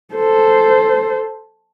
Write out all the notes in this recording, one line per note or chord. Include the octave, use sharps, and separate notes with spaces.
A4 C5